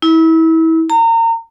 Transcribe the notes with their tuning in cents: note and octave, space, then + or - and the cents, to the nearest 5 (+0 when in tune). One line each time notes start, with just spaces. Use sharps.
E4 -30
A#5 -30